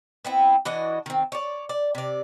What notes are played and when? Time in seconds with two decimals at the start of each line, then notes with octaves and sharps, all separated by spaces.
0.25 B3 C4 E4
0.65 E3 D4 F#4 D#5
1.06 D#3 C4
1.32 C#5 D5
1.69 D5
1.95 C3 D5